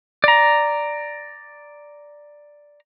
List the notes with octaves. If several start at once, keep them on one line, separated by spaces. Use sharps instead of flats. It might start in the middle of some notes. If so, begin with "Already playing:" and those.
D5 A#5